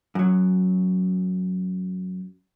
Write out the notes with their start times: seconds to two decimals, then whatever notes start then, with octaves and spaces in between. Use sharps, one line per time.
0.15 F#2 F#3